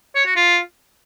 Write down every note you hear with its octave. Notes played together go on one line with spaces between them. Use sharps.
C#5
F#4
F4